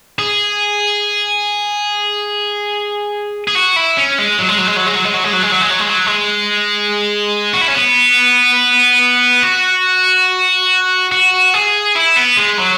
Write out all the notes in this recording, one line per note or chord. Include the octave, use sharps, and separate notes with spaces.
G#4
G#4
F#4
E4
C#4
G#3
F#3
G#3
F#3
G#3
F#3
G#3
F#3
G#3
F#3
G#3
F#3
G#3
F#3
G#3
F#3
G#3
F#3
G#3
F#4
E4
C#4
B3
F#4
F#4
G#4
E4
B3
G#3
F#3